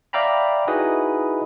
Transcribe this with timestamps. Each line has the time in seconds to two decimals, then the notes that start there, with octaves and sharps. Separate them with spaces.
0.13 D5 E5 F5 G5 A#5 B5
0.67 D#4 E4 F#4 G#4 B4 D#5